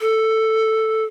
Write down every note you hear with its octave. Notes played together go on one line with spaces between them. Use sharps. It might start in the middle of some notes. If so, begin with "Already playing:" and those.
A4